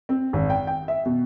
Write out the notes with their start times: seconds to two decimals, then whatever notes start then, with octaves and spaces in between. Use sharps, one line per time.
0.09 C4
0.33 G#1
0.50 G5
0.67 G5
0.88 E5
1.06 B2